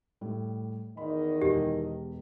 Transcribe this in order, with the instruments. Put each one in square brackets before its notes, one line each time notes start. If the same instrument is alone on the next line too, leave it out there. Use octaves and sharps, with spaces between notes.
[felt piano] A2 G3
[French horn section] E2 D#3 D#5 [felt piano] B5
[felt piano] E1 [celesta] G4